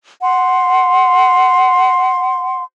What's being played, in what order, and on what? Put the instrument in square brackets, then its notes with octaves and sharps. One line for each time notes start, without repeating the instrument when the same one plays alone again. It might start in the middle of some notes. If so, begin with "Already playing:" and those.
[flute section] F#5 C6